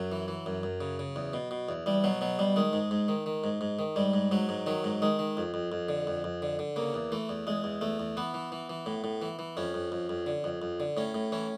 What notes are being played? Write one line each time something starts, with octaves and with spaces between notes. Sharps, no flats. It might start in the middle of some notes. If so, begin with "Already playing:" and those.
Already playing: F#2 F#3
E3
E3
F#2
F#2
C#3
C#3
E2
B2
B2
E2
E2 G3
B2 F#3
B2 F#3
B2 G3
D#3 G#3
G#2
G#2
D#3
D#3
G#2
G#2
D#3
G#2 G3
G#2
G#2 F#3
G#2
D#3 F#3
G#2
D#3 G#3
D#3
F2
F2
F2
D3
F2
F2
D3
D3
C#3 A#3
E2
E3 A3
E2
E2 G#3
E2
E2 A3
E2
E3 B3
E3
E3
E3
A2
A2
E3
E3
F2 C#4
F2
F2
F2
D3
F2
F2
D3
A2 C#4
A2
E3 C#4